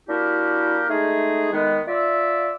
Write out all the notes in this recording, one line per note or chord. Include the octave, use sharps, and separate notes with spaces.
A#3 D4 E4 F#4 G4 A#4
G#3 A3 D#4 G#4
D#3 G#3 B3
F4 D5 E5